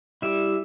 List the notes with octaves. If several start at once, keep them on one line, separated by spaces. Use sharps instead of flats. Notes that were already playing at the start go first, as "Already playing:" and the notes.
G3 E4 E5